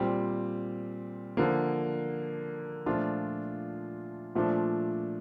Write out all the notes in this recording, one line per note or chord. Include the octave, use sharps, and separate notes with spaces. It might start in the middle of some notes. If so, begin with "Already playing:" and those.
Already playing: A#2 G3 C4
D3 F3 A#3
A#2 F3 A3 D4 F4
A#2 F3 A3 D4